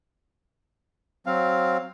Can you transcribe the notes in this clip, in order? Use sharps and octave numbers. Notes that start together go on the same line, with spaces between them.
F#3 C4 F5